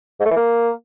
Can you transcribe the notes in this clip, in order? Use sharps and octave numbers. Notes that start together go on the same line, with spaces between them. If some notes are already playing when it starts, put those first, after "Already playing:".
G#2
A3
E3
A#3